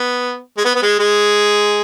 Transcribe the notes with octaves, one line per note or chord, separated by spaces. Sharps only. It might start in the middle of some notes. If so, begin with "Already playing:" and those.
Already playing: B3
G#3
B3
B3
G#3
G#3